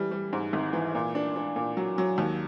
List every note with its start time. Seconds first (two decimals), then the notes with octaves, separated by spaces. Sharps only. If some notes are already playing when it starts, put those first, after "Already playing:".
Already playing: E3 G3
0.11 G3
0.33 G#2
0.53 G#1
0.73 E3
0.95 A#2
1.15 D4
1.36 D4
1.56 A#2
1.77 F#3
1.98 F#3
2.18 D#2